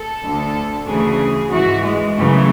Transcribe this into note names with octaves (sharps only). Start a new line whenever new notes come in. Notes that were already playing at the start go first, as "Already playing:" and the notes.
Already playing: A4
D2 D3
D2 C#3 E3 G#4
G#2 E3 F#4
G#3
F#2 C#3 E3 A3